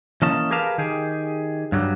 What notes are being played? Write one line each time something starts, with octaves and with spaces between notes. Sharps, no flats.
E3 A#3 C#4 D#5 A5
G4 G#4 A#4 B4 F5 A5
D#3 G4 G#4
G2 F#3 G3